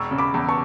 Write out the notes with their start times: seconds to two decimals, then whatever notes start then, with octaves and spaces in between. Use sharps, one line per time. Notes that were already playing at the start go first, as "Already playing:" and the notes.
Already playing: E1 C#6 E6
0.11 C#3
0.18 B5 D6
0.34 E2
0.49 A5 C#6